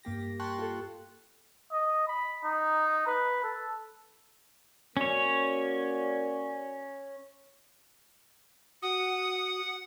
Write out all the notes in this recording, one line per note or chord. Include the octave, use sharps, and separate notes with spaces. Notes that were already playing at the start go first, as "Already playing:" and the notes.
G2 A#3 G4 A#6
G5 A5 C6 C#6 F#6
F4 A4
D#5
B5
D#4
B4
A4
A#3 C#4 F#4 C#5 D5
F#4 F#5 D#6